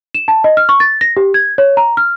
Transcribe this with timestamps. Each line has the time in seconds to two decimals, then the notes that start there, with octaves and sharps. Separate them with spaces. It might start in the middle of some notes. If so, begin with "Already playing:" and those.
0.14 E7
0.28 A5
0.44 D#5
0.57 F6
0.69 C#6
0.80 A6
1.01 A#6
1.17 G4
1.34 G#6
1.58 C#5
1.77 A#5
1.97 F6